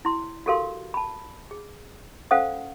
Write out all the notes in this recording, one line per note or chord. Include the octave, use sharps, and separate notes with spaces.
E4 C6
F#4 G4 A4 A#4 F5 C6
A5 B5
G#4
C#4 A4 C5 F5 F#5 D#6